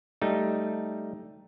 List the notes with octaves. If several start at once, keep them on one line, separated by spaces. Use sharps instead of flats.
G3 A3 D#4